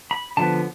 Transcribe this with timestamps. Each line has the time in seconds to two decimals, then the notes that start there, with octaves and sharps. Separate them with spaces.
0.11 B5
0.37 D3 F3 B3 A5